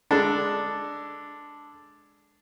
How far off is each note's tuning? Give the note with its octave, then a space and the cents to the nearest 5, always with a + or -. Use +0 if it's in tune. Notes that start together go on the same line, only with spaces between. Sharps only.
G#3 +0 D4 +0 A4 +0